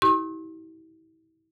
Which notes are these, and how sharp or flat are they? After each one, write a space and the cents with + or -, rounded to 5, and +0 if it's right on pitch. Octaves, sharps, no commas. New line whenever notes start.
E4 -35 G4 -35 C6 +45